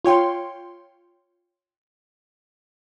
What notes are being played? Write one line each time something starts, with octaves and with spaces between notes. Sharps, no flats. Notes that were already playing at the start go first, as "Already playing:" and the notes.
F4 C#5 G5 C6